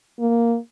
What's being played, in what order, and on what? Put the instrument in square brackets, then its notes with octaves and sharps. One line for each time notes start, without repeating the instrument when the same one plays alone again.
[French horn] A#3